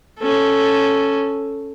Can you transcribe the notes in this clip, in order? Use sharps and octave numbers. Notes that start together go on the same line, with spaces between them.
C#4 A4